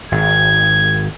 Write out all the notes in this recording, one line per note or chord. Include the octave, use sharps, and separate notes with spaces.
G#1 G#6